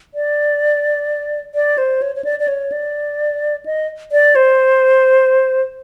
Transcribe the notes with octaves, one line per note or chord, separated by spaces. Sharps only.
D5
D5
C5
C#5
C#5
D5
D5
C#5
D5
D#5
D5
C5